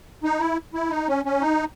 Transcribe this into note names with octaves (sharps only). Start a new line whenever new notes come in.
D#4
E4
E4
D#4
C#4
C#4
D#4